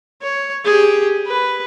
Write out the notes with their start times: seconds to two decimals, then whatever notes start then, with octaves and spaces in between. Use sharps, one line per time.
0.22 C#5
0.65 G4 G#4
1.27 B4